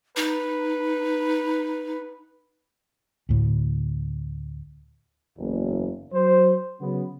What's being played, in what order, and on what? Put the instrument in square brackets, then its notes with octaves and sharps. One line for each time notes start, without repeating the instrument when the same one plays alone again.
[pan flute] D#4 [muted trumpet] B4
[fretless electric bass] D2 A2
[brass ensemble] F#1 E2
F#3 C5
C#3 F#3 B3